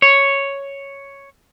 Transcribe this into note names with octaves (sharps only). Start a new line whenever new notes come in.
C#5